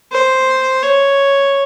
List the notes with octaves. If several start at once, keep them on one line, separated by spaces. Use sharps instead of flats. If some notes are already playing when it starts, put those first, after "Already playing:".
C5
C#5